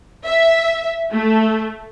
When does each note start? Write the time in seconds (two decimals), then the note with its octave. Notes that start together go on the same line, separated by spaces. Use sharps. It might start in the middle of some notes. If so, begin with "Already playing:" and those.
0.25 E5
1.11 A3